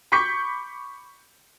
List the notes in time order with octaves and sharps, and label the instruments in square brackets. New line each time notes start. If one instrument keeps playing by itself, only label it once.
[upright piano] B5 C#6 D6 G6 B6 C#7